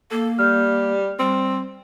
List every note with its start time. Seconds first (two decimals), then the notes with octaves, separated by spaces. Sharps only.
0.11 A#3 A4
0.39 G3 F6 G6
1.19 G3 C4